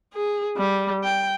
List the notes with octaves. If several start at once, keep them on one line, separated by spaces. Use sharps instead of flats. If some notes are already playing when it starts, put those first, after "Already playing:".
G#4
G3
G5